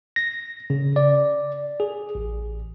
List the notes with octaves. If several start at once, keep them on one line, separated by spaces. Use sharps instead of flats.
A#6
C#3
D5
G#4
A1